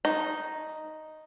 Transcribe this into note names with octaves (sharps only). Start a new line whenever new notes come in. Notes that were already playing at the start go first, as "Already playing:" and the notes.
D#4